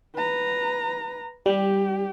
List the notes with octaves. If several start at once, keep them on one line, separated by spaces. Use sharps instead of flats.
B4 A#5
G3 G4